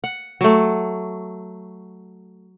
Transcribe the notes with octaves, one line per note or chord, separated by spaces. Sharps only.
F#5
F#3 A3